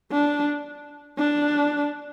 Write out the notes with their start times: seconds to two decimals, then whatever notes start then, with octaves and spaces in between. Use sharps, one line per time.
0.12 D4
1.18 D4